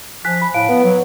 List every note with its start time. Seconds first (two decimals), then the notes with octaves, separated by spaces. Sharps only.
0.25 F3 G#5 F#6 B6
0.42 B5
0.54 A2 F5 A5 D7
0.69 B3 B4
0.84 F#3